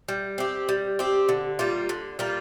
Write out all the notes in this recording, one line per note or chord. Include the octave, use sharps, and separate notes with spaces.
G3
C4 G4
G3
C4 G4
D3
G3 A#3 F4
D3
G3 A#3 F4